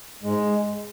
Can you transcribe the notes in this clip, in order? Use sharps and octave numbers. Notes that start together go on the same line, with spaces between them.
G#2 G#3